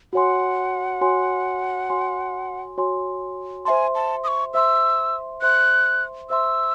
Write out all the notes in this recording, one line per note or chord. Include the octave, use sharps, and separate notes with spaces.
F#4 C#5 F#5 G#5 C6
F#4 C#5 G#5 C6
F#4 C#5 G#5 C6
F#4 C#5 G#5 C6
C5 E5 G#5 A5 C6
A5
D#6
C#6
C5 E5 C6 E6
C5 E5 C6 F#6
C5 E5 C6 E6